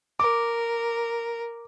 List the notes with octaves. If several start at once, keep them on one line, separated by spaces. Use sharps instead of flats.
A#4 D6